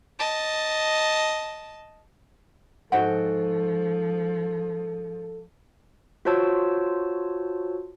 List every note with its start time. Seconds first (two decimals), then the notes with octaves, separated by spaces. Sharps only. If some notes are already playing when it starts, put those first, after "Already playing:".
0.19 D#5 A5
2.92 G#2 F3 F#4 A4 F#5 G5
6.25 F4 F#4 C5 C#5 A5 E6